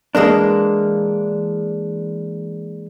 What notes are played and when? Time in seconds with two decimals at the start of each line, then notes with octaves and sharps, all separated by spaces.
0.15 E3 G#3 A#3 D4